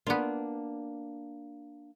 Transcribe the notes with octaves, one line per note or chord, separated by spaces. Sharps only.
A#3 B3 D4 F4